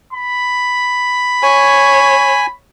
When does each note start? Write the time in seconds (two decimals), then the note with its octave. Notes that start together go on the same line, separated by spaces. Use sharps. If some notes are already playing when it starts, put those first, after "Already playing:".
0.13 B5
1.43 C#5 G#5